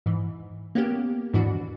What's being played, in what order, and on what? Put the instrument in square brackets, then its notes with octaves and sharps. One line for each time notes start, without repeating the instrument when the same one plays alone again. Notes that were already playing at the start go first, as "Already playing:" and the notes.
[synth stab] G#2 E3
A#3 B3 C#4 G4
D#2 G#2 E3 D4 F#4